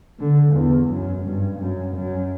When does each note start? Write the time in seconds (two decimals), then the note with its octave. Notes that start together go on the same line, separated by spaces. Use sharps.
0.19 D3
0.53 E2
0.89 F#2
1.25 G2
1.59 F#2
1.95 F#2